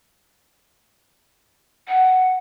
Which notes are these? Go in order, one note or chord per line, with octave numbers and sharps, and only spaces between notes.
F#5